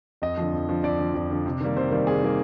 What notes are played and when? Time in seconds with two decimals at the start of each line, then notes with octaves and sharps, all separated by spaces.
0.22 F2 D#5
0.37 D3 F3
0.53 F2
0.68 D3 F3
0.83 F2 D5
0.99 D3 F3
1.14 F2 D5
1.31 D3 F3
1.46 C3
1.61 D#3 G3 A#3
1.76 C3 C5
1.91 D#3 G3 A#3
2.07 C3 G#4
2.23 D#3 G3 A#3